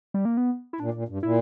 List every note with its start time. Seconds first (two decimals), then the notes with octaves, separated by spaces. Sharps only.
0.14 G3
0.25 A#3
0.37 B3
0.73 E4
0.80 A#2 D4
0.94 A#2
1.09 G2
1.23 A#2 E4